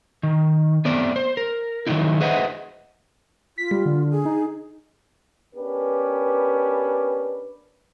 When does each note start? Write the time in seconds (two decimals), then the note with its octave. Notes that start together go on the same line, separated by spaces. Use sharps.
0.23 D#3
0.85 A3 B3 C4 D5
1.16 C5
1.37 A#4
1.87 D#3 F#3 G3 A3 D#4 E4
2.21 G#4 B4 C5 D#5 E5 F#5
3.58 F4 B6
3.71 G3
3.86 D3
4.11 G#4
4.25 D#4
5.55 B3 C#4 D4 G4 A#4 B4